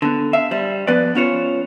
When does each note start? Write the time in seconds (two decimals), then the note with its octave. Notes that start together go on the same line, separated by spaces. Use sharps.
0.02 D3 B3
0.33 E5 F5
0.51 G3 C5
0.87 F3 B3 B4 D5
1.15 B3 C#4 F4 C5 C#5